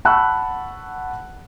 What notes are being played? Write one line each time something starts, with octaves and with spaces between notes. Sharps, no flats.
F#5 A5 B5 C#6 E6 F#6